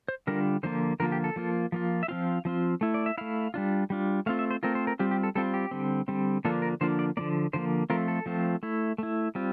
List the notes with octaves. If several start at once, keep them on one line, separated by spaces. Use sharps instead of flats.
C5
D3 G3 D4 F4 A#4
D3 F3 A#3 F4 C5
D3 F3 A#3 F4 A#4
G4
A4
F3 A#3 F4
F3 A#3 F4
E5
F3 C4 F4 F5
F3 C4 F4
A3 E4
D5
E5
A3 E4 F5
G3 D4 F4
G3 D4 F4
A3 C4 F4 F5
E5
C5
A3 C4 F4 A#4
C5
A#4
G3 C4 F4 G4
G4
A4
G3 C4 F4 A4
G4
D3 G3 C4
D3 G3 C4
D3 F3 A#3 D4 F4 A4
A#4
D3 F3 A#3 D4 F4 C5
D5
D3 F3 A#3 D5
D3 F3 A#3 C5
F3 A3 C4 F4 A#4
A4
F3 A3 C4 F4
A3 E4
A3 E4
G3 C4 F4